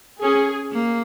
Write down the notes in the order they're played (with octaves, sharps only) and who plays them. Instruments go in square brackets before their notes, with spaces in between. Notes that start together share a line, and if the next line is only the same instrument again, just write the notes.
[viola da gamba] C#4 [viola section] G#4
[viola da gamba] A#3